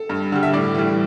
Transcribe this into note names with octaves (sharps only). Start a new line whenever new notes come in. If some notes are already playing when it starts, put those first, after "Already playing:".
Already playing: A4
G2
D3 G3
E5
A2 D5
E3 G3